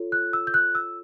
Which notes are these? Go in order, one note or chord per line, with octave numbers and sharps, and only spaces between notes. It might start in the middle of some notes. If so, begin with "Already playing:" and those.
Already playing: F4 A4 C#5
F#6
E6
G6
F#6
E6